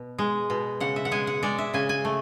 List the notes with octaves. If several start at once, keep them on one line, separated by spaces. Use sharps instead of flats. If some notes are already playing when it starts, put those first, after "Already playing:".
Already playing: B2
G#3
B2
C#3 F#5
E5
F#5
G#3 G#5
F#5
G#3 D5
E5
C#3 G#5
G#5
A3